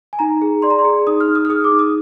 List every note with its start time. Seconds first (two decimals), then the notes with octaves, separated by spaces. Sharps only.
0.13 G#5
0.19 D#4 A#5
0.42 G#4
0.62 D5 C6
0.70 A#5
0.79 C6
0.85 G#4
1.07 D#4 D#6
1.20 F6
1.28 D#4
1.35 D#6
1.45 F6
1.50 G#4 D#6
1.64 D6
1.71 D#4
1.79 D#6